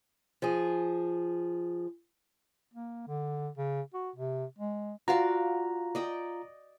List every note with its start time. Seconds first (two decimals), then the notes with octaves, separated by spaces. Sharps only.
0.42 F3 G#4
2.74 A#3
3.07 D3
3.57 C#3
3.94 F#4
4.16 C3
4.58 G#3
5.08 F4 F#4 D5 F5 A#5
5.95 D5 D#5 G5